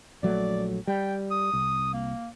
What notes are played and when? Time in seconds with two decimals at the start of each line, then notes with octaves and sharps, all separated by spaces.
0.23 A#1 F#3 A3 D5
0.87 G3 G5
1.31 D#6
1.53 C2
1.94 A#3